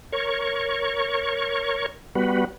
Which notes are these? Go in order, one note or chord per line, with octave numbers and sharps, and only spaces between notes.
A#4 C#5 C#6
G3 B3 F#4 B4